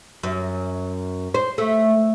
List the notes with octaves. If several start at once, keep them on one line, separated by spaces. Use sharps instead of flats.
F#2
C5
A3